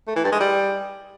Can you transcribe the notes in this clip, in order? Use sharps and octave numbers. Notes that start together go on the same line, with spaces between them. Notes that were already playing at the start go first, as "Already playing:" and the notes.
A3
E3
G2
G#3
G3